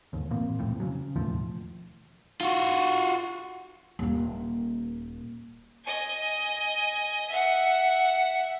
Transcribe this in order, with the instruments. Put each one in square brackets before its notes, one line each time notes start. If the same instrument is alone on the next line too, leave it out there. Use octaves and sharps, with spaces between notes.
[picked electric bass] G1 D#2
A1 A#2 A#3 C4
E1 C2 F2 A2
C#3 F#3
E1 D#2 A2 F3
[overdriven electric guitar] F4 F#4
[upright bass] D#1 A#3
[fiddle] D#5 G#5
E5 F#5